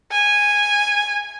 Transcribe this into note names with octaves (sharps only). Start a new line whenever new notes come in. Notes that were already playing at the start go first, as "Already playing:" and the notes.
G#5